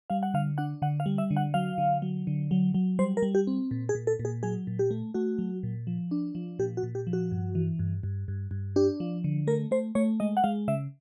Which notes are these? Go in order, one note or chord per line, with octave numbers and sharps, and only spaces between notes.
G3 F5
F#5
D3 F5
D4 F#5
D3 F#5
F5
G3
E5
D3
F#5
F#3 F5
D3
F#3
D3
F#3
F#3
G3 C5
A#4
G3
G4
C4
A#2
G#4
A#2
A4
A#2
G#4
F#3 G#4
A#2
G4
A3
A3 F#4
F#3
A#2
F3
D4
F3
A#2 G4
F#4
A#2
G4
F3
F#4
G2
E3
G2
G2
G2
G2
D4 G4
F3
D3
A3 A#4
A3 C5
A3 C#5
G#3 D#5
F#5
G#3 F5
C#3 E5